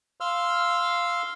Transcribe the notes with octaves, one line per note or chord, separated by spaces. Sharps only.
F5 C6 E6 F6